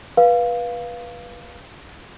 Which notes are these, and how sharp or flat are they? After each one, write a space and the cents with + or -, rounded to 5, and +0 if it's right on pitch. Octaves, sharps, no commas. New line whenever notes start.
B4 -20 F5 +0